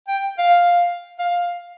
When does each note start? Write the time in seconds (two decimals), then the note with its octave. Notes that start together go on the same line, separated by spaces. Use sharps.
0.08 G5
0.38 F5
1.19 F5